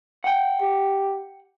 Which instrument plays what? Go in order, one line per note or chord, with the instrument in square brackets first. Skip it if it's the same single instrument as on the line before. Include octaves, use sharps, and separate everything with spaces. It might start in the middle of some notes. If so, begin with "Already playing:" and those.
[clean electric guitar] F#5 G5
[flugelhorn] G4